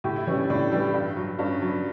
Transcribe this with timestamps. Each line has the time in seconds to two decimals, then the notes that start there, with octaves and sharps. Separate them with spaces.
0.04 A2 G4
0.16 E4
0.27 E3 C#4
0.31 G3
0.38 D4
0.50 A2 D4
0.72 E3 G3
0.94 G2
1.16 F#3
1.39 G2 C#4
1.62 F#3